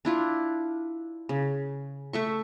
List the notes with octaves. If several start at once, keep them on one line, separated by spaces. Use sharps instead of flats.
D4 E4 F4
C#3
A3 E5 C#6